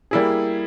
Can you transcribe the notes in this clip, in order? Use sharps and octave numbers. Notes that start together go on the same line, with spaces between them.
G3 A#3 E4 G#4